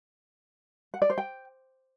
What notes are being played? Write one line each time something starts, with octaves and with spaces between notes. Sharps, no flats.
F#5
D5
C5
G5